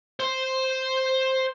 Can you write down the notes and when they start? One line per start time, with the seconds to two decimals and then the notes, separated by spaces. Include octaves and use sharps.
0.20 C5 C6